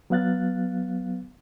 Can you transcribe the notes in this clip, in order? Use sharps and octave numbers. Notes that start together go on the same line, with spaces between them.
F#3 B3 F5 F#6 A6